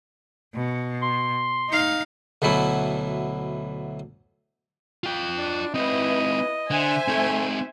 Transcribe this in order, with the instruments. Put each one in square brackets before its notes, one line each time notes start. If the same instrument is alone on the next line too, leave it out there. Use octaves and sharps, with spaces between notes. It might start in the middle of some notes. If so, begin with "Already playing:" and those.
[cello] B2
[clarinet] C6
[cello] D#4 F5
[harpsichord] D2 B2 E3 F#3 E4
[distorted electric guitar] F4 G5
[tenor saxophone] D4
[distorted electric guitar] C4 D#4 [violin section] E4 B4 [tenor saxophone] D#5
[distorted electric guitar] D3 [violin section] C5 E5 G#5
[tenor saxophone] A3 [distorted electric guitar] C4 D#4